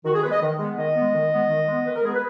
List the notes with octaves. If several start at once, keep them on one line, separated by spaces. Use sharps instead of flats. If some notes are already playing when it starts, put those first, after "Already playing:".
D#3 F#4
G#4
G#3 B3 B4
D#5
D#3
G#3 B3
D#3 D#5
G#3 B3
D#3
G#3 B3
D#3
G#3 B3
D#3 B4
A#4
G#3 B3 G#4
B4